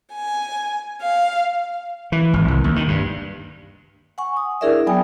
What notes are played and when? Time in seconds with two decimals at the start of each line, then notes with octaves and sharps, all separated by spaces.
0.14 G#5
1.02 F5
2.12 E3
2.33 G#1
2.48 C2
2.64 D#2
2.76 D#3
2.88 G2
4.18 F#5 G#5 C#6
4.37 D#6
4.61 D4 E4 G#4 A#4 D5 E5
4.86 F#3 B3 G5 G#5 D#6